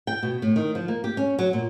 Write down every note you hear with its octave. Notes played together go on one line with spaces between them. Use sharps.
G5
B2
A2
D#3
F3
A#3
G4
C#4
F#3
A#2